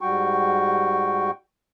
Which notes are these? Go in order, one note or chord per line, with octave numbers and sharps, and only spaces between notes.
G#2 G3 F#4 G5 C#6